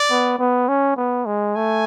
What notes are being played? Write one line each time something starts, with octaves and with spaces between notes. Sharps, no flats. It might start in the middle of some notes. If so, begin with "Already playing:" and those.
Already playing: D5
B3
B3
C#4
B3
G#3
A3 G#5